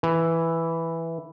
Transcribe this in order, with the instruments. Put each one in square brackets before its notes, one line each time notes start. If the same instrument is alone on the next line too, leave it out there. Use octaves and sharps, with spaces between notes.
[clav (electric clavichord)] E3